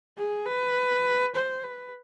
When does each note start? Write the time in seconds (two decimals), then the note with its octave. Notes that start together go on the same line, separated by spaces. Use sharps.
0.17 G#4
0.46 B4
1.35 C5
1.64 B4